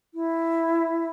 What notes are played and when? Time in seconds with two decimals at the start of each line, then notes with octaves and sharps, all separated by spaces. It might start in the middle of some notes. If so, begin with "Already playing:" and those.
0.14 E4